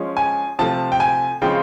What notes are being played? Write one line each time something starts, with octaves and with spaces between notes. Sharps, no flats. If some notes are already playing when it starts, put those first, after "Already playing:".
Already playing: F3 G#3 C#4
G#5
C3 F3 A3 A5
G5
G#5
C#3 F3 G#3 C4 G5